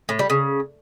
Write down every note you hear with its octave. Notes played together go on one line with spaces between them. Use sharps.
A2
G3
C#3